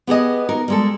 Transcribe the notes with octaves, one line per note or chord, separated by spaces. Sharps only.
B3 G4 G#4 D#5
D#4 A#4
G3 G#3 A4